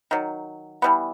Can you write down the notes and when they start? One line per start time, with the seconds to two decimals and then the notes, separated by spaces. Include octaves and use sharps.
0.11 D#3 F#3
0.82 E3 G3 B3